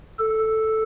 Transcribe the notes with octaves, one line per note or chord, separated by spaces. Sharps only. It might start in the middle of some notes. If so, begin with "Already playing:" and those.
A4